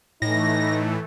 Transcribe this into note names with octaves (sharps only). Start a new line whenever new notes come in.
A2 E3 A3 D#4 A#6